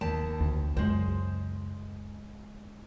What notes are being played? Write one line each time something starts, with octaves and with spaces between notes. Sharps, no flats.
D#2 A5
D2
C#2 F#2 G#3 C5